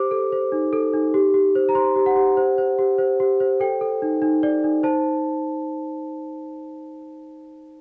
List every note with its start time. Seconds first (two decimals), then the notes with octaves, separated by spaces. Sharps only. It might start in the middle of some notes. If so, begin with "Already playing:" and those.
Already playing: G4 C5 D6
0.11 A4
0.32 C5
0.52 D#4
0.73 A4
0.93 D#4
1.14 G4
1.34 G4
1.56 C5
1.69 A#5
1.75 C5 C6
1.96 G4
2.06 F#5
2.16 G4
2.37 C5
2.58 C5
2.79 G4
2.98 C5
3.20 G4
3.40 C5
3.60 A4 G5
3.81 A4
4.02 D#4
4.22 D#4
4.43 D5
4.64 D#4
4.83 C5 A5